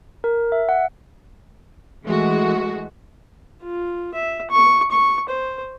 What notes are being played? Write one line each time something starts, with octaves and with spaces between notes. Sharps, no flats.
A#4
E5
F#5
E3 G#3 A3 F#4
F4
E5
C#6
C#6
C5